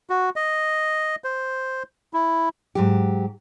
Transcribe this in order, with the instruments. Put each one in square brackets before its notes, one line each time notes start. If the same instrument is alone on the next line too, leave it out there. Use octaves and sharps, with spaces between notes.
[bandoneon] F#4
D#5
C5
E4
[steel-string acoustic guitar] G#2 F#3 G4